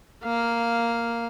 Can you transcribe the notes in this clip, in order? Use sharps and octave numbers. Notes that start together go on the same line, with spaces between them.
A#3 F5